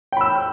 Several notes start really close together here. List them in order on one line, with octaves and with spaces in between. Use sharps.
G5 B5 E6